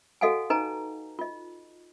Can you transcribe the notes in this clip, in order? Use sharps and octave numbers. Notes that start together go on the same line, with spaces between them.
F#4 A4 D#5 F5 F#5 G#5
D#4 B4 D#5 G#5 A#5
F4 D#5